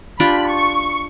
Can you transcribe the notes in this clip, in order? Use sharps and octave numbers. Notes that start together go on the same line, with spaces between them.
D4 F4 G4 B5
C#6